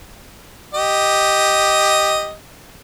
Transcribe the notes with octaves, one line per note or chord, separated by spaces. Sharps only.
G4 D#5